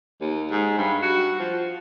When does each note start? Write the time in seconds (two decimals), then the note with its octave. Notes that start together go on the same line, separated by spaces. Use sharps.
0.21 D#2
0.51 G#2
0.78 G2
1.03 F#4
1.40 F3